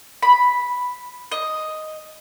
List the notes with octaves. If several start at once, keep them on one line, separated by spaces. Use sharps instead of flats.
B5
D#5